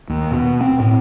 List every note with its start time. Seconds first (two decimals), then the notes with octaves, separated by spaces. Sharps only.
0.09 D#2
0.31 B2
0.61 C4
0.80 A2